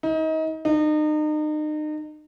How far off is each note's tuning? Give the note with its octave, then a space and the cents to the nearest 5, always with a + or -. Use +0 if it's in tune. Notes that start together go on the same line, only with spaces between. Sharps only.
D#4 +30
D#4 -35